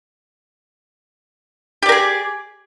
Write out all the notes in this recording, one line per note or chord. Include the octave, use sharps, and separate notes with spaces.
G4 G#4 A#4 D5